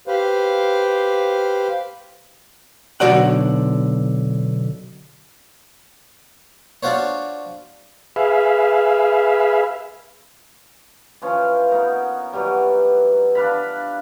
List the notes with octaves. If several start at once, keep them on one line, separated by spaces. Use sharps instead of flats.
G4 B4 C5 F5
B1 D3 E3 F#4 D5 F#5
D4 F4 F#4 C5 C#5
G#4 B4 E5 F5
E3 F3 C#4
B3 D#4 A#4
E3 F#3 G3
D4 B4 F5 B5